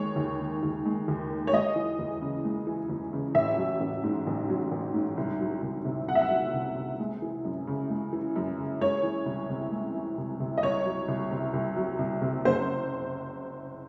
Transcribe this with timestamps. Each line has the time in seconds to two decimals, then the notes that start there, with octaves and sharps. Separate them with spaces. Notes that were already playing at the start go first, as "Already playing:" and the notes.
Already playing: D#2 G#3 C#5
0.16 D#2
0.40 D#3
0.63 D#2
0.85 G#3
1.08 D#2
1.30 D#3
1.47 C#5
1.52 G#3 D#5
1.76 E3
1.99 E2
2.22 C#3
2.45 G#3
2.67 E3
2.89 E2
3.13 C#3
3.34 A1 E5
3.57 F#3
3.80 A1
4.03 G#2
4.27 A1
4.49 F#3
4.71 A1
4.94 G#2
5.17 C2
5.40 F#3
5.62 C2
5.85 C3
6.08 C2 F#5
6.15 E5
6.21 F#5
6.30 F#3
6.54 C2
6.76 C3
7.00 G#3
7.22 E3
7.44 F#2
7.67 C#3
7.90 G#3
8.13 E3
8.36 F#2
8.58 C#3
8.81 G#3 C#5
9.03 E3
9.26 C2
9.50 C3
9.71 G#3
9.95 E3
10.18 C2
10.40 C3
10.58 D#5
10.62 C2 C#5
10.85 F#3
11.08 C2
11.31 C3
11.53 C2
11.76 F#3
11.99 C2
12.21 C3
12.45 F#1 C5